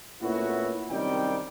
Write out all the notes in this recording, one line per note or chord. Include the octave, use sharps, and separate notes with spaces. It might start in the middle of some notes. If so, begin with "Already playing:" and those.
A#2 A3 B3 C#4 E4 F#4
C2 F#2 D#3 G3 C4 G5